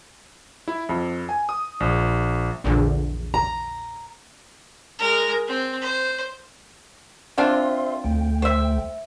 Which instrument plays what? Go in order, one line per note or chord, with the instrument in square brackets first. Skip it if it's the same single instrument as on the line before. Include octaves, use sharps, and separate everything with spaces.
[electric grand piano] E4
F2
G#5
D#6
A#1
[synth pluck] A#1 E2 D3
[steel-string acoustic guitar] A#5
[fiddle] G#3 A#4
C4
C5
[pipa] C4 D4 F4 [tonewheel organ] C5 E5 C6
[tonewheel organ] D2 A3 G5
[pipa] C5 E5